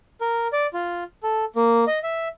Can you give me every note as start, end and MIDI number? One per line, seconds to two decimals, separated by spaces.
0.21 0.48 70
0.53 0.67 74
0.74 1.04 65
1.23 1.45 69
1.56 1.85 58
1.87 1.99 75
2.03 2.28 76